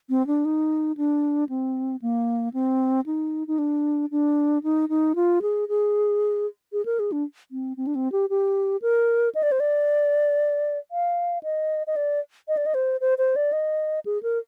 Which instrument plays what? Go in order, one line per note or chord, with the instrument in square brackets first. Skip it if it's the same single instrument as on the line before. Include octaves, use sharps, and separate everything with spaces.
[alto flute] C4
D4
D#4
D4
C4
A#3
C4
D#4
D#4
D4
D4
D#4
D#4
F4
G#4
G#4
G#4
A#4
G#4
D4
C4
C4
D4
C4
G4
G4
A#4
D#5
D5
C5
D5
F5
D#5
D#5
D5
D#5
D5
D#5
C5
C5
C5
D5
D#5
G#4
A#4